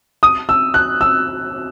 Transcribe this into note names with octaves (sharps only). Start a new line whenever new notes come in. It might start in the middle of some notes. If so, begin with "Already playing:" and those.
D#6
E6
F#6
E6